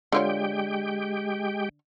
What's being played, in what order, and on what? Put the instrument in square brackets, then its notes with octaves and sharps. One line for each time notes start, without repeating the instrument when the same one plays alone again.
[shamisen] D3 F4 C#5 [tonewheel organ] G#3 G4 G5